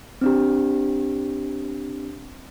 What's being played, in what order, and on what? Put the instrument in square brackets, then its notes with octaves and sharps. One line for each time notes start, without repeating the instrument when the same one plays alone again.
[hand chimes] C4 D4 G4